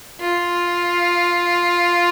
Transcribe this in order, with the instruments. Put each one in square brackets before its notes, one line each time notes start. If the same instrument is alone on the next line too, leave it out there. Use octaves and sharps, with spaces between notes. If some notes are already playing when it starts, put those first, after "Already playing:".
[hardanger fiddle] F4